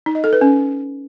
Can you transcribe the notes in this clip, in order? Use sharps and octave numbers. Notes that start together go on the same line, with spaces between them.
D#4
D#5
A4
B4
C#4